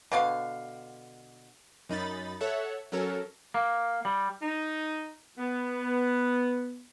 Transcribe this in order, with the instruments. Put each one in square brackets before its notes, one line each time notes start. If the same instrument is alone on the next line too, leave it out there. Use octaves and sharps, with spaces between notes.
[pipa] B2 D3 F5
[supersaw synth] F#2 D#4 B5 A6
A4 C#5 E5 F#5
F#3 C#4 A4 A#4
[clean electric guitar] A#3
G3
[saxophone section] D#4
B3